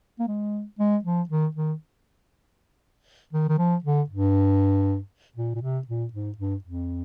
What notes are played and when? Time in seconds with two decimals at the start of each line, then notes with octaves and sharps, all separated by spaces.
0.19 A#3
0.28 G#3
0.79 G#3
1.04 F3
1.29 D#3
1.55 D#3
3.33 D#3
3.49 D#3
3.58 F3
3.84 D3
4.10 G2
5.36 A#2
5.55 A#2
5.62 C3
5.87 A#2
6.13 G#2
6.38 G2
6.64 F2